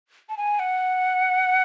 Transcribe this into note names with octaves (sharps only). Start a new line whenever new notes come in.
A5
G#5
F#5